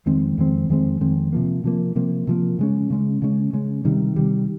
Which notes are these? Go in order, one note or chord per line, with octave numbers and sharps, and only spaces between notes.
F2 D#3 G#3 C4
F2 D#3 G#3 C4
F2 D#3 G#3 C4
F2 D#3 G#3 C4
C3 F3 A#3
C3 F3 A#3
C3 F3 A#3
C3 F3 A#3
C#3 G#3 C#4
C#3 G#3 C#4
C#3 G#3 C#4
C#3 G#3 C#4
C3 D#3 G3
C3 D#3 G3